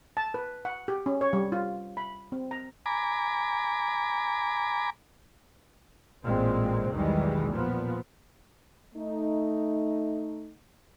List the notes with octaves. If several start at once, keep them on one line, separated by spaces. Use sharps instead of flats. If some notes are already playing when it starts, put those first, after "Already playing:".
A5
B4
F#5
G4
C#4
C#5
G3
F4
B5
C4
A#5
G#5 A#5 B5 D6
A1 A#2 G#3 C4
B1 E2 D#3 E3 G3 G#3
A#2 F3 B3
A3 D#4